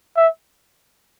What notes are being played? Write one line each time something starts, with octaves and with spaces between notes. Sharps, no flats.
E5